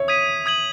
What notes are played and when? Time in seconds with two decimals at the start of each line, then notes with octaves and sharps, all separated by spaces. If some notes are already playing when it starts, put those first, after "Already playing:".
Already playing: C#5 E5
0.08 D#6 G#6 B6 D#7
0.46 D#6 G#6 D#7 F#7